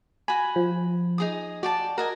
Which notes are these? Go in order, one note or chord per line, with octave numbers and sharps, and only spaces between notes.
F#4 G#5 B5
F3
D#4 G#4 D#6
F#4 D5 G5 A5
F#4 A#4 D#5 G#5